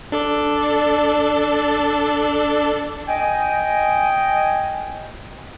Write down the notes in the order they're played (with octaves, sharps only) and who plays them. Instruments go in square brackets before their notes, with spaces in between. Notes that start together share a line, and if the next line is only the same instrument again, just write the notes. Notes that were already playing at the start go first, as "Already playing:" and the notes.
[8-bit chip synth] D4 A4 D5
[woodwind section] D#5 G5 G#5